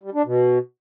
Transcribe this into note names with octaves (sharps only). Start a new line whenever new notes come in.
G3
D4
B2